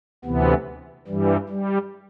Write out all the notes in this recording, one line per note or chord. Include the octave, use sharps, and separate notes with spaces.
D2 C3 E3 B3
G2 E3 G3
G3